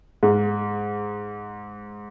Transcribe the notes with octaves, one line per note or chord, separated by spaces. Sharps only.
G#2